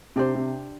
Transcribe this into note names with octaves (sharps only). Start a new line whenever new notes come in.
C3 D4 G4 C5
C3